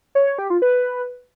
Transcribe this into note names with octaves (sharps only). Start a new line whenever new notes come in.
C#5
C#5
G4
F4
B4